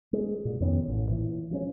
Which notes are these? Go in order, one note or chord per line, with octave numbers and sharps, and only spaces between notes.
G#3
A#2
F2 D#3 B3 C#4
A1 A2
A#2 E3
F3 G#3 C#4